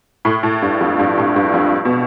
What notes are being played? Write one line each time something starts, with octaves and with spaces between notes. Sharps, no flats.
A2
A2
G2
F2
G2
A2
G2
F2
B2